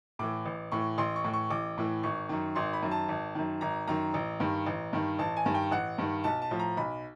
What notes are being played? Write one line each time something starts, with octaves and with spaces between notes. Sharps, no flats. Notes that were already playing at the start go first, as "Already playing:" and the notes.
A2 E3 D6
A1
A2 E3 C#6
A1 C6
C#6
A2 E3
C#6
A1 D6
A2 E3
G#1 C#6
F#2 D#3
G#1 C6
B5
F#2 D#3
A5
G#1
F#2 D#3
G#1 A#5
F#2 D#3 A#5
A1
G2 D#3
A1
G2 D#3
A1 A5
G#5
G2 D#3
G5
A1 F#5
G2 D#3
B1 A5
A5
A2 F3
A#5
B1 B5